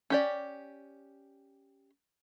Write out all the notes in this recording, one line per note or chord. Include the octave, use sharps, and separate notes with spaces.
C#4 G4 D5